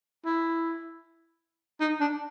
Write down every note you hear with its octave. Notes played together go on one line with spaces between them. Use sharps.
E4
D#4
D4